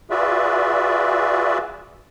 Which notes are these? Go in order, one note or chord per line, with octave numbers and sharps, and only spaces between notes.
F4 F#4 G#4 B4 D5 E5